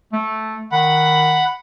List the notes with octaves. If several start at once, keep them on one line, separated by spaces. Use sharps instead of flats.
A3
D#3 F#5 B5